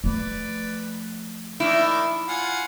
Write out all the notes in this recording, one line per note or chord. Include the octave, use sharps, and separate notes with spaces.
F3 A3 B4 D5
D#3 A#3 D4 E4
F4 F#5 G#5